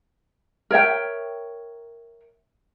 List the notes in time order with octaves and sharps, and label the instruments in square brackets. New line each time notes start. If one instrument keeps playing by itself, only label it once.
[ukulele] A#4 C#5 E5 G5